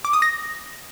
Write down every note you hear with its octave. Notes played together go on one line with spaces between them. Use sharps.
D6
D#6
A#6